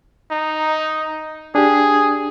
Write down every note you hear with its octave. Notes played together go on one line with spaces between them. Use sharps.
D#4
D4 G4 G#4